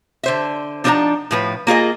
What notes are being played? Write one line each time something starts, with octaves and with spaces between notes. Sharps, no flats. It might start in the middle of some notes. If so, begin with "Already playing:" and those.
D3 C5 E5
F3 D4 D#4 A#4 F#5 A#5
A2 F3 B4
A#3 F4 G#4 D#5